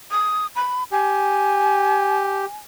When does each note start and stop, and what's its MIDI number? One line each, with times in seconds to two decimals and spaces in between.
0.11 0.47 87
0.56 0.84 83
0.92 2.46 67
0.92 2.56 80